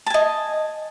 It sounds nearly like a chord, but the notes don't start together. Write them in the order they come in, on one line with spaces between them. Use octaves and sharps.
A5 G#5 D#5